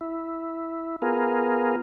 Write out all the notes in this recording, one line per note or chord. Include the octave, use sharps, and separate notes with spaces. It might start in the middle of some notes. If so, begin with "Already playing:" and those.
E4
B3 F4 G#4 A#4